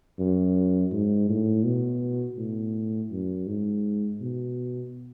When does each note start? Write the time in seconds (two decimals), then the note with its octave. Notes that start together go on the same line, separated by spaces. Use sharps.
0.19 F#2
0.92 G#2
1.29 A2
1.65 B2
2.38 A2
3.11 F#2
3.47 G#2
4.21 B2